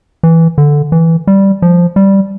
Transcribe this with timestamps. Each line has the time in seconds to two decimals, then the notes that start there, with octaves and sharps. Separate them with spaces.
0.23 E3
0.58 D3
0.92 E3
1.27 G3
1.62 F3
1.96 G3